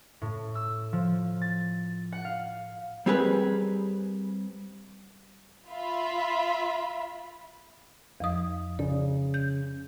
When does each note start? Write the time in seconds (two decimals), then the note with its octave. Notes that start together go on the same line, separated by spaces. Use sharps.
0.22 A2
0.55 E6
0.93 F3
1.42 A6
2.12 F#5
2.25 F5
3.06 G3 C4 G4 G#4 A#4 B4
5.69 F4 E5 B5
8.20 F2 F3 D#6
8.79 C#3 D5
9.34 G6